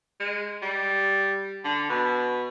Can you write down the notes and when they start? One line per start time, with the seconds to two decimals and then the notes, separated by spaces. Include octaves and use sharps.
0.20 G#3
0.62 G3
1.65 D3
1.89 B2